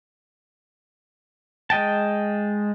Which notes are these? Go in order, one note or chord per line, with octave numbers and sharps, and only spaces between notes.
G#3 D#5 G5 A5